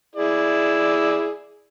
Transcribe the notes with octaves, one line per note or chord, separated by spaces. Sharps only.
E4 G#4 D5